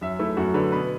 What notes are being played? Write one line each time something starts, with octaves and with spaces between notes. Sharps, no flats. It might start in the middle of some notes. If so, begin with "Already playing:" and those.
F#2 E5
A3 E4
F#2 F#4
D3 B4
B2 B4